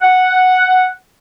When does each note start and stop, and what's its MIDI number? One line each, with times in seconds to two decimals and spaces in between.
0.02 0.89 78